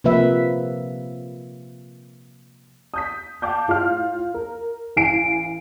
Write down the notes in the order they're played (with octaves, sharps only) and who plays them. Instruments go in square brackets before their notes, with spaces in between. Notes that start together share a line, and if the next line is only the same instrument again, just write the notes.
[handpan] C3 F3 A#3 B4 E5
[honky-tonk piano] D#6 G6 B6
F5 A5 D6 G6
A2 F4 F5 F6
A#4
A1 E3 F5 G#5 C7 D7